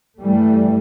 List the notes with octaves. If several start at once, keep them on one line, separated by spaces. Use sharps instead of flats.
G2 E3 G3 A3